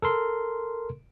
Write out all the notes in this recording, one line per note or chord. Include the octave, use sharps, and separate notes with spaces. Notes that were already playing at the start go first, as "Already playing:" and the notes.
A4 A#4 C6